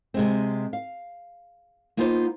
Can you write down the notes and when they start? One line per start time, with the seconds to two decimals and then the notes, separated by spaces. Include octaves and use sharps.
0.14 C3 G#3 C4
0.73 F5
1.97 A#3 B3 D#4 F4 G#4 C5